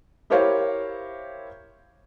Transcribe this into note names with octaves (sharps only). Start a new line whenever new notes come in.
E4 G4 A#4 C5 C#5 F5